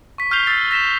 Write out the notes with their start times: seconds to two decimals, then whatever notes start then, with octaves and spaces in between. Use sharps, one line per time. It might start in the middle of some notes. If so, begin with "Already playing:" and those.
0.18 C#6 B6
0.31 C#6 F6 G6 C7 F7 G7
0.46 E6 A6 B6 C7
0.70 E6 A#6 B6 E7 G7